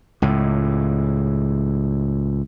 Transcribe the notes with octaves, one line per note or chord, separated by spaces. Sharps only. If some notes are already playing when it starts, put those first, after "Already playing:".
C#2 A2